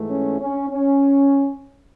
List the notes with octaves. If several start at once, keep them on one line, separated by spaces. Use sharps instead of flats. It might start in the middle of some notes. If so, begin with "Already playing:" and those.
Already playing: G#2 E3 A3
C#4
C#4
C#4